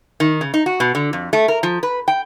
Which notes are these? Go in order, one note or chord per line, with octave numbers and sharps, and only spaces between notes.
D#3
C#3
D#4
F#4
B2
D3
F2
A3
A#4
F3
B4
G5